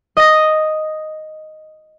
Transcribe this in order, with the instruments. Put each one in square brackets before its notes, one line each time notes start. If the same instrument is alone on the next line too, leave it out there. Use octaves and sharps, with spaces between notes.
[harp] D#5 A#6